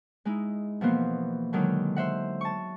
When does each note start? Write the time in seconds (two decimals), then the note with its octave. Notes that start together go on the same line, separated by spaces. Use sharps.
0.25 G#3 D#4 E4
0.81 B2 E3 F3 A#3 B3 C5
1.53 D3 D#3 F#3 G#3
1.96 C5 E5 F#5
2.41 A5 C#6